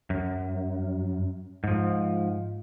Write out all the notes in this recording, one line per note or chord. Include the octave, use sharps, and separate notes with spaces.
F#2
G#2 F3